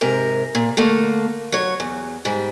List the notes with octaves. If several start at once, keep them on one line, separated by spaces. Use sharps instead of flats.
G#2 C3 A#4
A#2
D3 A3 A#3
F#3 C#5
E2
G#2 G3